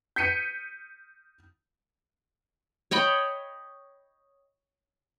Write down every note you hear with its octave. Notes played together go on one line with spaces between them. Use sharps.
G6 B6 C#7 D#7
C#5 D#5 G5 B5